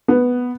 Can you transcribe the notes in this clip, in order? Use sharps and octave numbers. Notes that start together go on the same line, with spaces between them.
B3